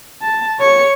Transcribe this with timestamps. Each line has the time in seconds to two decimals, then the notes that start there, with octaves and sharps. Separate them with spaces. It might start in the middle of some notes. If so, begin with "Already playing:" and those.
0.22 A5
0.60 C#5 C#7